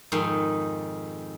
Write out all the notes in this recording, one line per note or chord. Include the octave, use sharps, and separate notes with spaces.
F2 G#2 D#3 C6